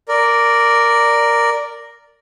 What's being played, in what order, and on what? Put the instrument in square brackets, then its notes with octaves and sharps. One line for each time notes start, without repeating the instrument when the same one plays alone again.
[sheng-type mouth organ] A#4 D5